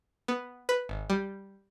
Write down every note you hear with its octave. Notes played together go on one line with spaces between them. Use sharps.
B3
B4
G#1
G3